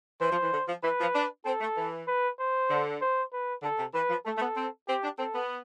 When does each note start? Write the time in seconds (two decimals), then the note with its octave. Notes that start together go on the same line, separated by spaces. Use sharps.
0.21 E3 C5
0.32 F3
0.42 E3
0.52 D3
0.68 F3
0.83 E3 B4
0.99 F3
1.15 D4
1.45 C4 A4
1.61 A3
1.77 E3
2.07 B4
2.39 C5
2.70 D3
3.01 C5
3.33 B4
3.63 D3 A4
3.78 C3
3.94 E3 B4
4.09 F3
4.25 A3 A4
4.37 A3
4.41 B3
4.56 C4
4.88 C4 G4
5.03 D4
5.18 C4 A4
5.35 B3